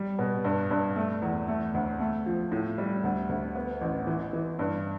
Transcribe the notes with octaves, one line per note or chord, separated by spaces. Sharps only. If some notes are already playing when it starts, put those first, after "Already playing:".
Already playing: G3
B2
G2
G2
A3
E2
A3
D2
A3
F3
A2
G3
D2
D2
B3
A1
E3
E3
G2